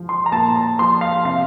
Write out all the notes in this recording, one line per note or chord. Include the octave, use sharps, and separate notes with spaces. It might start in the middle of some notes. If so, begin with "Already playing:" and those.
Already playing: F3
C6
A#5
A#2 A5
A#5
F3 C6
F5
C3 F5